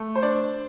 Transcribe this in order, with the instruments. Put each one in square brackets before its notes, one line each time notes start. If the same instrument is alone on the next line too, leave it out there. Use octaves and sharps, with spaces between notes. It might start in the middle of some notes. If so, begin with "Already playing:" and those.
Already playing: [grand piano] A3
[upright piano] C5
[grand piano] D4 [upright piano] D5